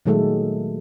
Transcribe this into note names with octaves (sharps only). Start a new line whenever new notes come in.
A#2 D#3 F#3 G#3 A3 A4